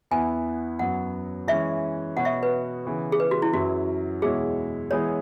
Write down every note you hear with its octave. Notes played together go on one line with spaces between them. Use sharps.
E2 E3 B3 E4 G#5
F#2 F#3 B3 F#5
E3 G#3 C#4 E5
B2 B3 F#4 C#5 F#5
E5
B4
C#3 E3 B3
G#4
B4
F#4
E4
F#2 F#3 E4 F#4
E2 B2 G#3 E4 G#4 C#5
E3 G#3 B3 E4 G#4 C#5